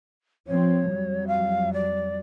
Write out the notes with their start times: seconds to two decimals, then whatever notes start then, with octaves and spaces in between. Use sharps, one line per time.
0.47 F3 C4 C#5
0.90 F2 F#3 G3
1.27 F5
1.73 D5